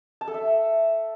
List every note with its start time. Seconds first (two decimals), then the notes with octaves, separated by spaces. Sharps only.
0.21 A5
0.28 A4
0.34 E5